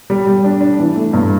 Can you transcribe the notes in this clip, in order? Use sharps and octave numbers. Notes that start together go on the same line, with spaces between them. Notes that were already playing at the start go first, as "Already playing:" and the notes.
G3
G3
D4
D4
E3
A3
G2